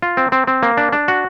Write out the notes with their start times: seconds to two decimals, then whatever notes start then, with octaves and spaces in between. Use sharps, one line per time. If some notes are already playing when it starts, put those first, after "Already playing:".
0.02 F4
0.17 C4
0.32 C4
0.47 C4
0.63 A#3
0.77 D4
0.92 D4
1.08 F#4